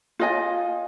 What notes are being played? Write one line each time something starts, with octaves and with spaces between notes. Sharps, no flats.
F4 D#5 G#5